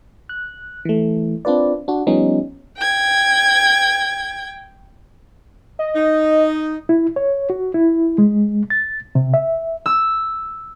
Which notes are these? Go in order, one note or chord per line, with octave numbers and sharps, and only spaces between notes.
F#6
E3 A3
C4 D4 F4 B4 D5
D4 F#4
F3 G3 B3 C#4 D#4
G5 G#6
D#5
D#4
E4
C#5
F#4
E4
G#3
A6
C3
E5
E6